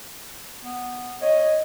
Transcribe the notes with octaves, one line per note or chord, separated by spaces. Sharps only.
B3
C#5 D#5